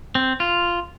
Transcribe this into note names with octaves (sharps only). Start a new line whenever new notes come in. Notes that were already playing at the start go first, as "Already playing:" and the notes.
C4
F4